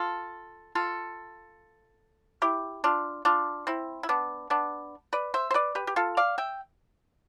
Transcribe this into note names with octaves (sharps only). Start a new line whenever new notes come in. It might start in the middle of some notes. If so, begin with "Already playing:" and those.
Already playing: F4 A4
F4 A4
E4 G4
D4 F4
D4 F4
C4 E4
E4
B3 D4
B3 D4
B4 D5
C5 E5
C5
B4 D5
G4 B4
G4
F4 A4
D5 F5
E5 G5